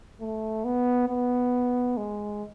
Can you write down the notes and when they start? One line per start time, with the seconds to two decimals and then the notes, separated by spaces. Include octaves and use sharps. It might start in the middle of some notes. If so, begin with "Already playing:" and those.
0.21 A3
0.64 B3
1.08 B3
1.97 G#3